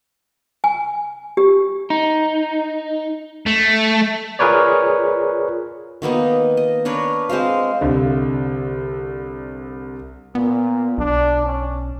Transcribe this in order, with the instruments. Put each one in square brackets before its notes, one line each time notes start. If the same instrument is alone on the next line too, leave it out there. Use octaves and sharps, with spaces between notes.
[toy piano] G#5
G4
[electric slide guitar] D#4
[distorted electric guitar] A3
[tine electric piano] F4 G#4 A#4 B4 C#5 D5
[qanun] D#3 A#3 B3 D#4
D#5
D4 A#4 B4 C#5
G#3 C4 C5 F5
[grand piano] C2 D3
[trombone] A#2 [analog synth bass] B3
[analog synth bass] B1 [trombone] D4
[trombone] C#4